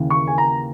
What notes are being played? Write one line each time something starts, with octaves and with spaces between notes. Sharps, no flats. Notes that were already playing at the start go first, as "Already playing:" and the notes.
Already playing: D#2 C#3 E3
C#6
G#5
A#5